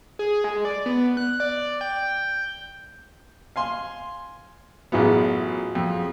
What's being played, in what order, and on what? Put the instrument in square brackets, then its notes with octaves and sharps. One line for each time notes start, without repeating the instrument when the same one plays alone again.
[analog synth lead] G#4
G#3
D5
B3
F#6
D5
G5
[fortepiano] F5 G#5 C6
[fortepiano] A1 B3 [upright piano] F#3 F4 G#4
[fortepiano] F2